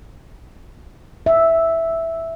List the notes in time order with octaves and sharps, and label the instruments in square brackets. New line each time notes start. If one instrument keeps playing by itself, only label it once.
[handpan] E5